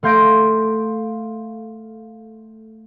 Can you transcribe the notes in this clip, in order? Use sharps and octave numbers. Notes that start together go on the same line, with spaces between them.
A3 F5 C6 G6 A#6 D7